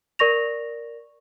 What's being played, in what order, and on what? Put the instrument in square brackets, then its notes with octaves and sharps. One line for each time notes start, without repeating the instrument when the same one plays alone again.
[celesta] A#4 D5 C#6 A#6 F7